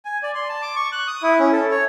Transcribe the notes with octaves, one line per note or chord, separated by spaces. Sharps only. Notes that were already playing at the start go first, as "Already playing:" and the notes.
G#5
D5
C6
A5
D6
C#6
F#6
D#6
E4
C#4
A4
C#5